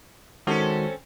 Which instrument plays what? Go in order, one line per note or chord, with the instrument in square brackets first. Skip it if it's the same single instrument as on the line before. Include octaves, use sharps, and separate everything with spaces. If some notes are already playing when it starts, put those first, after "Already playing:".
[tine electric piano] D#3 G#3 F#4 [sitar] C4 C#4 A4